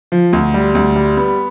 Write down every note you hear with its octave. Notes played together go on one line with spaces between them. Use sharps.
F3
D2
G3
D2
G3
B3